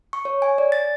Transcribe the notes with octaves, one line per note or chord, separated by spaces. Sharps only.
C#6
C#5
G#5
D5
A6